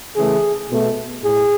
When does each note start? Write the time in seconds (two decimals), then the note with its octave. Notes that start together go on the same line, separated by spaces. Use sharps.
0.16 C#3 E3 A3 G#4
0.70 B2 A3
1.24 A2 G#4